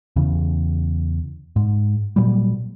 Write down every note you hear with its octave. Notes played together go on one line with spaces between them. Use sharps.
E2 C#3
G#2
A#2 F#3 G3